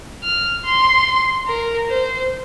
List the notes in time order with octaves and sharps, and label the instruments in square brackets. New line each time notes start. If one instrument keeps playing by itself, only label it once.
[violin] F6
C6
A#4
C5